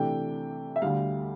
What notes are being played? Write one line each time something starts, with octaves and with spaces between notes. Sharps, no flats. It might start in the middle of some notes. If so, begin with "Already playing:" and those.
Already playing: C3 E3 A3 D4 G5
E5
D2 D3 G3 F5